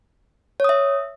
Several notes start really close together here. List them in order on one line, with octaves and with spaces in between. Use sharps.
C#5 D#6 E5